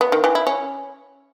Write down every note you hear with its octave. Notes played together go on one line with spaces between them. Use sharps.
B3
D#3
E3
E4
C#4